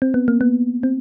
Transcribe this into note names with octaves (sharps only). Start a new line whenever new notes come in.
C4
B3
A#3
B3
C4